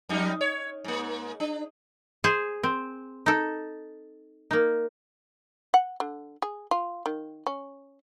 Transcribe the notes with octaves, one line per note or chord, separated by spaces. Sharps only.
F2 G3 D#4
C#5
G#2 A#3
D4
G#4 C5 G#5
C4
D#4 A4
A#3 D#4
F#5
D3
G#4
F4
D#3
C#4